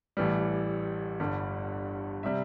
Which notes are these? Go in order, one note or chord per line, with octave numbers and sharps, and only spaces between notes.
A1 A2 E3 G3
G1 G2 D3 G3
C3 G3 E5